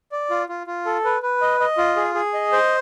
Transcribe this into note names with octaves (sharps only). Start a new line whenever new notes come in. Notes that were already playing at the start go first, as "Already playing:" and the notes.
D5
F4
F4
F4
A4
B4
B4
D#5
D#5
F4
G#4
G#4
D#5
C5